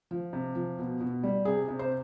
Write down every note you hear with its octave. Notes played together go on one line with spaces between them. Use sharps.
F3
C3
F3
B2
B2
G3
C3 G#4
C3
C5